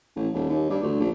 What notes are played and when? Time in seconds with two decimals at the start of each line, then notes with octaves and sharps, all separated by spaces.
0.16 A1
0.34 D#1
0.49 D#2
0.70 G2
0.83 D2
1.00 A#1